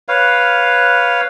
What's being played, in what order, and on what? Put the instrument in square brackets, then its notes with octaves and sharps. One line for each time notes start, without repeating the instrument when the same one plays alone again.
[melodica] B4 C#5 F5